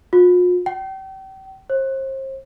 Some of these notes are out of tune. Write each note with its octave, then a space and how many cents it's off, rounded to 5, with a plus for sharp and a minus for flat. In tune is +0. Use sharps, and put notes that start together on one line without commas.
F4 +45
G5 -35
C5 +35